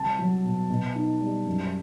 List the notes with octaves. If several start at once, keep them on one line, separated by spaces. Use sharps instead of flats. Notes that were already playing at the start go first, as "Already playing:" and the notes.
Already playing: C2 A5
F#3
B2
B2
D#4
G3
F#2